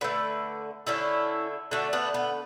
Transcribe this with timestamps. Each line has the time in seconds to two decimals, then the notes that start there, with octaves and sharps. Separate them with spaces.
0.01 D3 A3 B4 D5
0.87 D3 A3 C#4 E4
1.71 D3 A3 D4 F#4
1.93 B3 D4
2.14 B3